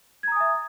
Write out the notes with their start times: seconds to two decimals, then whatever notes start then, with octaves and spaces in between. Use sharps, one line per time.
0.23 G#6
0.28 A#5
0.32 D#6
0.36 G#5
0.40 E5